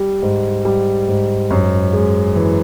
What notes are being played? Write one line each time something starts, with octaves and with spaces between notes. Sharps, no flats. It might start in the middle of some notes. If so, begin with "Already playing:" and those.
Already playing: G3
G#2
G3
G#2
F#2
G#3
E3